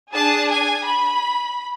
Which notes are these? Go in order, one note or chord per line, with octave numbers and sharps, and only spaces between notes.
D4 G#4 A5
G#5
B5